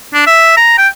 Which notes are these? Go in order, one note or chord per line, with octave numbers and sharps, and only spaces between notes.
D4
E5
A#5
G5